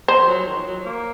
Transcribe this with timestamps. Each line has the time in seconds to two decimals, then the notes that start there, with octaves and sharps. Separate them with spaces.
0.08 F3 C5
0.27 F#3
0.47 D#3
0.57 F3
0.67 F#3
0.86 A#3